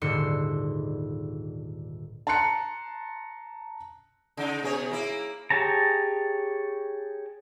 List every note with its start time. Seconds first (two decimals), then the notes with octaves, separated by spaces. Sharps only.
0.01 D#1 G#2 D3 C6 E6 C#7
2.27 A5 A#5 C6 F#6 C#7
4.37 C#3 D#4
4.63 B2 G#4 C#5
4.91 A#3 E4
5.50 G4 G#4 C#5 A5 A#5